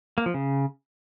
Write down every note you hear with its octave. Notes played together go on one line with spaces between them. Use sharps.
A#3
F3
C#3